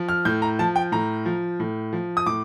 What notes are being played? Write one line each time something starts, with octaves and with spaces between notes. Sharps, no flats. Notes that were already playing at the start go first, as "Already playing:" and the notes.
Already playing: F3
F6
A2 G6
A#5
F3 A5
G5
A2 A#5
F3
A2
F3
D#6
A2 D6